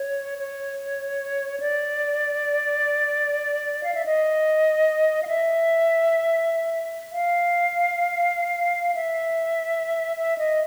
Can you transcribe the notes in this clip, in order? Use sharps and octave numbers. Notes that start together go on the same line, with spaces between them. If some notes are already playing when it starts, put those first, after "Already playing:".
Already playing: C#5
C#5
D5
F5
E5
D#5
F5
E5
F5
E5
E5
D#5